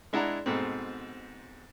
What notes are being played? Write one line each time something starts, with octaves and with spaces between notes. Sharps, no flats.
G#3 D4 E4 F#5 A#5
G#2 B2 A3 C4